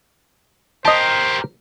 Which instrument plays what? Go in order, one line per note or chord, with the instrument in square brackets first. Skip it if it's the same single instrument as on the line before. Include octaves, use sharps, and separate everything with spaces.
[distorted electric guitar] G4 A#4 [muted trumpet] C5 [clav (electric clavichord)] D#5 A5